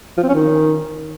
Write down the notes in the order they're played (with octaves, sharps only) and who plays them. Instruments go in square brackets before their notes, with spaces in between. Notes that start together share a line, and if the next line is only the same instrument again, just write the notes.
[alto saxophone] F3
C4
C#4
D#3